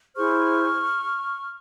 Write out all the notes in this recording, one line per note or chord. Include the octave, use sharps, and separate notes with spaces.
E4 G#4 C5 C#6 F6